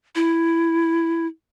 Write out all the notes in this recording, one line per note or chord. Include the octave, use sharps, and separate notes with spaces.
E4